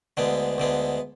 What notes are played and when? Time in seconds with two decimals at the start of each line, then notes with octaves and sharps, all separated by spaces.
0.17 D2 D3 G#3 B3
0.58 D2 D3 G#3 B3